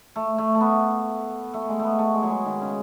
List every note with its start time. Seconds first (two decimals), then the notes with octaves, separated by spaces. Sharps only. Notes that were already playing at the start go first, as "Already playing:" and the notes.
0.16 A3
0.38 A3
0.55 A3
0.60 B3
1.54 A3
1.69 G#3
1.79 A3 B3
1.99 A3
2.14 G#3
2.23 F#3
2.30 G#3
2.45 D#3
2.61 C#3